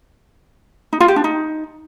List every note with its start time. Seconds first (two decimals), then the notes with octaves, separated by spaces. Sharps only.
0.93 D#4
1.00 F4
1.08 G4
1.16 D4
1.24 D#4